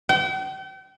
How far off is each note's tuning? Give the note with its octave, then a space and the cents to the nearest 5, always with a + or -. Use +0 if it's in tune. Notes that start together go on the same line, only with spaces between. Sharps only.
G5 -40